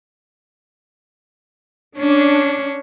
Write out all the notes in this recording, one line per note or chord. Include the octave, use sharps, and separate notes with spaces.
C#4 D4